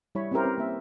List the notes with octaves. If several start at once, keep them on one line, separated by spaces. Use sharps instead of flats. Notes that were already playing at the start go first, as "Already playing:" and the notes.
G3 E4 C#5 B5
C4 C#4 E4 G4 A#4 C5
C4 B4
A#3 E5